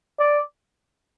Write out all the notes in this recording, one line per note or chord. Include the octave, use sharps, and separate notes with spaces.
D5